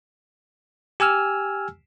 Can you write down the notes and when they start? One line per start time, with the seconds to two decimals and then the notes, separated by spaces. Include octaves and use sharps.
1.00 G4 G#5 E6 F6